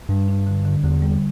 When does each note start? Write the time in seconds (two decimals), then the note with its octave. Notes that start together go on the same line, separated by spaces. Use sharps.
0.09 G2 G3
0.28 D4
0.47 D3
0.65 D3
0.84 E2 D3
1.02 G3